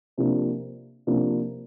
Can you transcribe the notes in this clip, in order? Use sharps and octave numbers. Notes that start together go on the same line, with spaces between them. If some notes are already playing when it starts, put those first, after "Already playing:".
C3 F3 A#3 D4
C3 F3 A#3 D4